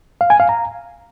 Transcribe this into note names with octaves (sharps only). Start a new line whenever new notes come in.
F5
G#5
F5
A#5